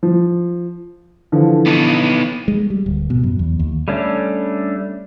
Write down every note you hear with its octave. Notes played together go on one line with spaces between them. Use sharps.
F3
D3 E3 F3
B3 D#4
G#3
G3
D1
B2
F#2
E2
D#2
G3 A3 C#4 D4